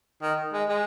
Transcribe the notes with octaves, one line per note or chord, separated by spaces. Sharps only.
D#3
G#3
G#3